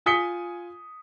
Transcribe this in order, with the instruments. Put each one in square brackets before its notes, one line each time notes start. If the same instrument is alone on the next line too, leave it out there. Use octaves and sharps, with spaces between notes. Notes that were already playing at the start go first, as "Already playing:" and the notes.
[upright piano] F4 G#5 D#6 B6 C#7 G7